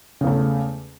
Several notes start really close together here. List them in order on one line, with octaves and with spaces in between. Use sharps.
C#3 E2 A3